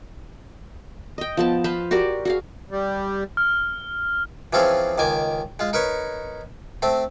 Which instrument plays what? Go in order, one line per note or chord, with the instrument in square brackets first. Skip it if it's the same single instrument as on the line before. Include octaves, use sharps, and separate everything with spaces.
[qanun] D#5 G5
F3 B3 A5
B4 C5 F5 B5
F#4 G4 A#4 D5
F#4 G#4 F5
[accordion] G3
[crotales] F6
[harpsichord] E3 F3 C4 C#4 F4 G#4
C#2 D#3 G#5 D6
G#3 F4
D#4 A#4 B4 C#5
A3 C4